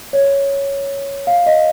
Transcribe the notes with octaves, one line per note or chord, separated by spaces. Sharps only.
C#5
F5
D#5